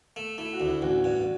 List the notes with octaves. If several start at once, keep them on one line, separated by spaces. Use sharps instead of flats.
A3
A3 E4
F#4
D2
E4
A1 F#4
G2